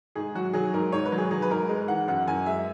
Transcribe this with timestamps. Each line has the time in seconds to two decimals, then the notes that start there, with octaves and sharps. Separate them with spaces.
0.15 G#2 G#4
0.35 F#3 F#4
0.54 F#3 G#4
0.74 G#2 A#4
0.92 G#2 C#5
1.06 B4
1.12 F#3
1.18 G#4
1.31 F#3 G#4
1.42 B4
1.50 G#2 A#4
1.69 G#3
1.88 E3 F#5
2.08 F#2 F#5
2.27 F#2 G#5
2.46 G#3 E5